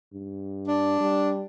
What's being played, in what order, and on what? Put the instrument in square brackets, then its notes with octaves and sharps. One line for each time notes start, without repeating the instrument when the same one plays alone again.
[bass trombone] G2
[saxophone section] D4
[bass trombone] G3